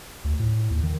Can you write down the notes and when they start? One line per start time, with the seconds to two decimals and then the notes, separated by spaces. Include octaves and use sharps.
0.24 D2
0.39 A2
0.70 D#2
0.83 D#3